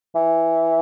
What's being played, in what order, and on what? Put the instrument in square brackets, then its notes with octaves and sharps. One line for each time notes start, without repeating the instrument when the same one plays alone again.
[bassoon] E3